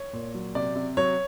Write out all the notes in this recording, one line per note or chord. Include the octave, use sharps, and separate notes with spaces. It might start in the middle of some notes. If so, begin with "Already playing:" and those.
Already playing: C#5
A#2
F#3
C3 D5
C3
F#3 C#5